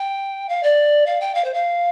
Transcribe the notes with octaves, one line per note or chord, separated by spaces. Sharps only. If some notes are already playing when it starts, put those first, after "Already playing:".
Already playing: G5
F5
D5
F5
G5
F5
C5
F5